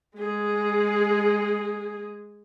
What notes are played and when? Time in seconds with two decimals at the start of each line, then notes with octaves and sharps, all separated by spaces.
0.17 G#3 G#4